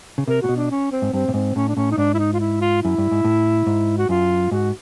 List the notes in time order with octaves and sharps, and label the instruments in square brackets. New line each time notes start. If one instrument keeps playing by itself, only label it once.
[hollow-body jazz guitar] C#3
[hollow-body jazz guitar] C3 [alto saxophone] A#4
[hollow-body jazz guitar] A#2 [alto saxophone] F#4
[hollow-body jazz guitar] B2
[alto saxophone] D4
C#4
C4
[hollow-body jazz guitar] G#2
[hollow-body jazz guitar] G2 [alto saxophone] C4
[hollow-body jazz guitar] A2
[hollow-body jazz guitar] G#2 [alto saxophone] C4
[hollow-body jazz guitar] A2 [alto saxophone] C#4
[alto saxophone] D4
[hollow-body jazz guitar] A2 [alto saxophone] C#4
[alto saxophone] D#4
[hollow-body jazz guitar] G#2 [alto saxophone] D4
[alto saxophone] E4
D#4
F4
E4
F4
[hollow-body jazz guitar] F#2 [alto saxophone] E4
[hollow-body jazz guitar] G2
G#2
A2
G#2
[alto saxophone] F#4
[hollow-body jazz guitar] F#2 [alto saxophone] F4
[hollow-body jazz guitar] G#2 [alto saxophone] F#4